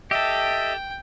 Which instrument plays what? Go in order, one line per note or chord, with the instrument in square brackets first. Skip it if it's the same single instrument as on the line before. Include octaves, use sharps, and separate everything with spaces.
[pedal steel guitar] G4 A4 [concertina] D#5 E5 [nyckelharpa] G5